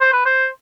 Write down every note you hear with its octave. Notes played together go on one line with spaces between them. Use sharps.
C5
B4
C5